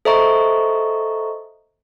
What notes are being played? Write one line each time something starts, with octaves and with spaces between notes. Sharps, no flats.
A4 C5 D#5 E5 A#5 C#6